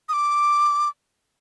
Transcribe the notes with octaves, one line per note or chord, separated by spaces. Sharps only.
D#6
D6